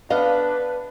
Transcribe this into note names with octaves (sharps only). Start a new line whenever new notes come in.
B3 D4 B4 D#5 F5